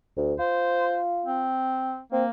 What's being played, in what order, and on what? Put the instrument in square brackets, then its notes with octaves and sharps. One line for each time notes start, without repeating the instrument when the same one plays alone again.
[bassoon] D2
[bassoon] F4 [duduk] C5
[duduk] C4
[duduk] A#3 [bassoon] C4